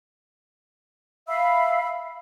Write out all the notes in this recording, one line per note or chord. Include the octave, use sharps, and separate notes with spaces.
E5 F5 B5 E6